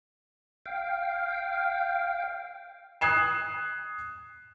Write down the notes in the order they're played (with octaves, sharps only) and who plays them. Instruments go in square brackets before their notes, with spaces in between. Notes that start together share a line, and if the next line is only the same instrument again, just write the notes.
[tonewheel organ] F5 G5
[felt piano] D#6 F#6 G#6 C7 E7